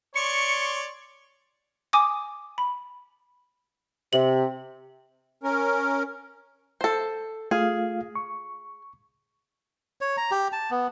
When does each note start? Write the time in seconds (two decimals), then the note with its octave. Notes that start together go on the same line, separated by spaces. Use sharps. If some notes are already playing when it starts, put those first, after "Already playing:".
0.16 C#5 D5 C6 C#6 C#7
1.93 G#5 D6 D#6
2.58 B5
4.13 C3 F#7
5.43 C#4 A#4
6.81 A4 C5
7.51 A3 F4 G#4 F5
8.16 C#6
10.01 C#5
10.17 A#5
10.31 G4
10.52 A5
10.71 B3